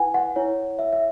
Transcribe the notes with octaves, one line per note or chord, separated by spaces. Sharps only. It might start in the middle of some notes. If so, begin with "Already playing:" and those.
Already playing: E4 B4 F#5 G#5
F#5
E4 C#5
E5
E5